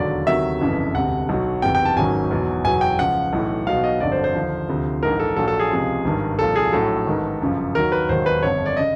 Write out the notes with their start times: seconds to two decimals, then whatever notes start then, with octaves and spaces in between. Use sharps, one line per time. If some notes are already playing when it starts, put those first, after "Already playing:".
Already playing: E1 D#2 D3 F#3 D5
0.27 D2 C3 D#3 F#3 E5
0.61 G1 F2 C#3 E3
0.94 E1 D2 C3 F#5
1.29 B1 B2 F#3
1.62 F#1 E2 C3 G5
1.75 G5
1.85 A5
1.97 G#1 F#2 D#3 F#3 G#5
2.31 E2 B2 F#3
2.64 F#1 E2 B2 F#3 G#5
2.81 G5
2.98 C#2 C#3 F3 F#5
3.33 B1 A2 E3
3.67 B1 B2 F#3 F5
3.84 D#5
4.00 G1 F2 D3 F#3 D5
4.12 C5
4.24 C5
4.35 D#2 D3 F3
4.69 D2 C3 F3
5.02 A#1 G#2 E3 A#4
5.20 A4
5.36 A#1 A#2 F#3 A4
5.48 A4
5.59 G#4
5.71 C#2 C3 F3
6.05 G#1 G2 D#3
6.39 C2 A#2 F3 A4
6.56 G#4
6.72 A#1 A2 F#3 A4
7.07 A1 G#2 D#3
7.41 G1 F#2 C#3 F3
7.74 D#2 D#3 F#3 A#4
7.92 B4
8.09 E1 D#2 D#3 F#3 C5
8.26 B4
8.43 G1 F2 D3 C#5
8.66 D5
8.77 C#3 D#5